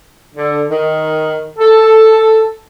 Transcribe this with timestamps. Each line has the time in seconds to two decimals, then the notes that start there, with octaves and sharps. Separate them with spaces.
0.35 D3
0.69 D#3
1.58 A4